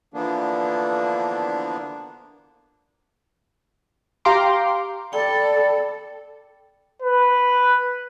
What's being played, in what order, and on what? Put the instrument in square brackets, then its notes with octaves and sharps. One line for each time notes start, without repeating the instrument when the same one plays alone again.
[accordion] D3 E3 F3 A#3 B3 D4
[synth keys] G4 F5 G5 A#5 C6 D6
[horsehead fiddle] A4 [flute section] D5 [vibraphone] G5 B5
[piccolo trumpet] B4